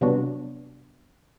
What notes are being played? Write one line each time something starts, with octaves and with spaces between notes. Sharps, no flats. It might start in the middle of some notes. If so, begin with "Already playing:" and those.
C3 F#3 G3 B3 D4 F#4